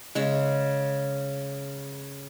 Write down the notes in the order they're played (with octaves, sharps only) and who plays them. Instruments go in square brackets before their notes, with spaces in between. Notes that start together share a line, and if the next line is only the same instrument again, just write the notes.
[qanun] C#3 G#3